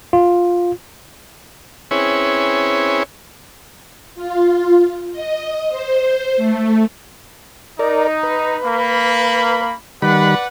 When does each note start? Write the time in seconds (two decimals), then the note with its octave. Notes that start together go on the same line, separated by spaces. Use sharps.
0.13 F4
1.91 C4 C#4 E4 G#4 B4 C#5
4.15 F4
5.12 D#5
5.68 C5
6.37 A3
7.79 D#4 A#4 D5
8.23 B4
8.64 A#3 B5
10.02 D#3 G3 B4 D5 F#5 B5